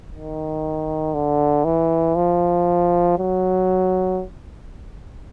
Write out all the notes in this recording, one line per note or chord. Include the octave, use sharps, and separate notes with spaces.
D#3
D3
E3
F3
F#3